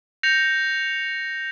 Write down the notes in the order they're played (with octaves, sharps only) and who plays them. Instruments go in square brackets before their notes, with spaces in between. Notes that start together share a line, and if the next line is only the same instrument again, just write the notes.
[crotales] G6 A#6 C#7 F7